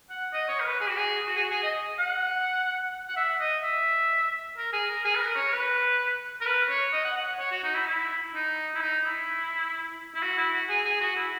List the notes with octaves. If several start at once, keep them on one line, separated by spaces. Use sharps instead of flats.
F#5
D#5
C#5
A#4
B4
G#4
F#4
G#4
F#4
G#4
F#4
G#4
D#5
F#5
F#5
E5
D#5
E5
A#4
G#4
A#4
G#4
B4
A#4
C#5
B4
A#4
B4
C#5
D#5
F#5
F#5
C#5
F#4
D#4
E4
E4
D#4
E4
D#4
E4
E4
F#4
E4
F#4
G#4
G#4
F#4
E4